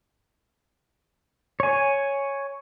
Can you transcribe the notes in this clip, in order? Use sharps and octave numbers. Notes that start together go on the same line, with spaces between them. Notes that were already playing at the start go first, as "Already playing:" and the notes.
C#5 G#5